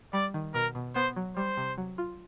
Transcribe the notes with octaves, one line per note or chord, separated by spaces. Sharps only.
G3 D5
D#3
B2 A#4
B2
B3 C5
F#3
G3 C5
C3
F#3
F4